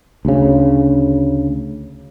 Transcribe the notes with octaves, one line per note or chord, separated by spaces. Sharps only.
D2 C#3